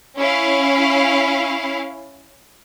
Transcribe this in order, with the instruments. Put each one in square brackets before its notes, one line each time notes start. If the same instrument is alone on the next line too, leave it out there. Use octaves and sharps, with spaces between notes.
[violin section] C#4 E4 F5